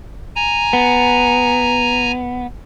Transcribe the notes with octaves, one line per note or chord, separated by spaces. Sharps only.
G#5 A#5
B3